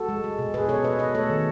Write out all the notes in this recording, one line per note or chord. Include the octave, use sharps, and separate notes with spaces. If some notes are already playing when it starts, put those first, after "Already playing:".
Already playing: F#4 A4
G#3
G#3
B2
B2 G#4 B4
B2 A4 C#5
B2 B4 D#5
B2 B4 D#5
A3 A4 C#5
D#3